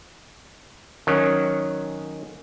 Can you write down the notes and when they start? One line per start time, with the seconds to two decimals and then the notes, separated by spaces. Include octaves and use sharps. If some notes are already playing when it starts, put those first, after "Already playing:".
1.07 D#3 F#3 C#4